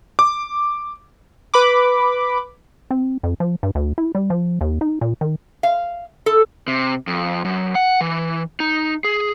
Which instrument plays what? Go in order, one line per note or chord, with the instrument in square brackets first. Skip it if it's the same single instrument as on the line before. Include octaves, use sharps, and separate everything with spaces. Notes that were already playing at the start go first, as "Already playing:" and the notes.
[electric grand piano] D6
[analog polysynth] B4 B5 D6
[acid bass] C4
F2
F3
G2
D2
E4
G3
F3
D#2
D#4
A#2
D#3
[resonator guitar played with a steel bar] F5
A4
[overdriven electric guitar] C3
F2
F#2
F#5
E3
D#4
G#4